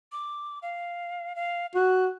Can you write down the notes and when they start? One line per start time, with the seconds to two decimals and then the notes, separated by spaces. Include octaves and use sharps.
0.12 D6
0.62 F5
1.36 F5
1.75 F#4 F#6